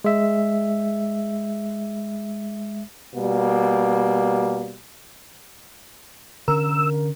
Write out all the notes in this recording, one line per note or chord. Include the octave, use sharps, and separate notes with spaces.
G#3 E5
B2 G3 A#3
D3 C#4 A#4 E6